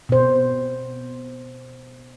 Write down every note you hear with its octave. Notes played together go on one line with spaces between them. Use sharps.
B2 C5